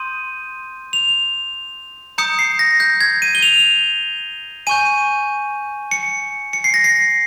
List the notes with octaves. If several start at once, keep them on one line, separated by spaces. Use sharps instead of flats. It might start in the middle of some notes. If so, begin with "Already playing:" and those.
Already playing: C6 D#6 G6 D#7
F7
A#5 D#6 G6 C#7
C7
A#6
G6
G#6
D#7
G7
F7
G#5 C#6 G6 D#7
C#7
C#7
C7
A#6
C7